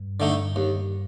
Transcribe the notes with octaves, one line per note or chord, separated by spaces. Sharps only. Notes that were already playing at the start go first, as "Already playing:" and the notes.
Already playing: G2
D3 A3 D#4
D#2